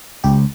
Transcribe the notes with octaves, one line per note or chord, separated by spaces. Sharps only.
C#2 G4